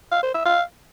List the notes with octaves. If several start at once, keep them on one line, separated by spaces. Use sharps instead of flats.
F5
C5
E5
F5